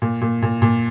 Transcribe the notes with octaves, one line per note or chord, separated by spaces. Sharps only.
A#2
A#2
A#2
A#2